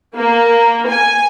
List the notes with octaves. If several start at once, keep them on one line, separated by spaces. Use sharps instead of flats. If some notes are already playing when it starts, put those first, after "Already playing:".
A#3
G#5